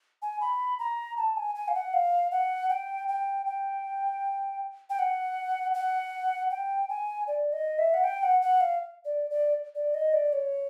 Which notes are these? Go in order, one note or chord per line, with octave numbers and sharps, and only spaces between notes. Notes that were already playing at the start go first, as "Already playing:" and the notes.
G#5
B5
A#5
A5
G#5
G#5
F5
F#5
F5
F#5
G5
G5
G5
G5
F#5
F#5
G5
G#5
D5
D#5
E5
F#5
G5
F#5
F#5
F5
D5
D5
D5
D#5
D5
C#5